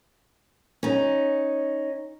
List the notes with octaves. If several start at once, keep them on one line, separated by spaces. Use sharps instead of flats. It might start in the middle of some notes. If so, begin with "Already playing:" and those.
C#4 D#4